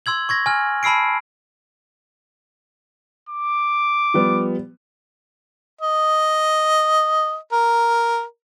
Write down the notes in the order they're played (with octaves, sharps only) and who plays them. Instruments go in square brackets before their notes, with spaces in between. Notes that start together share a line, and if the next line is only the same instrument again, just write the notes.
[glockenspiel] C6 E6 G#6 F#7
C#6 G#6 A#6
G#5 F6
A5 B5 E6 C7 D7
[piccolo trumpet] D6
[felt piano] F3 G3 B3
[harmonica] D#5
A#4